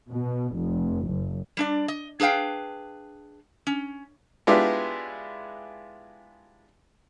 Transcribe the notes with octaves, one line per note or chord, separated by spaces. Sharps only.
B2
F1
F#1
G3 D4 D5
D#5
D4 G#4 B4 F5 G5
C#4
G#3 B3 D4 E4 F4 G4